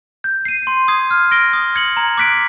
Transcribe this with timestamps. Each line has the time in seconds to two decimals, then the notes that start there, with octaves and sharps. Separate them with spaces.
0.24 G6
0.45 C7 D#7
0.67 C6
0.88 D#6 G#6 C7
1.11 F6
1.31 A#6 D7 G7
1.53 D#6
1.76 G#6 C#7 F#7
1.97 A#5
2.18 D6 F#6 B6 D7